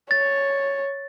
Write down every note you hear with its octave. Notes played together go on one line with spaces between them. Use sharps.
C#5 A6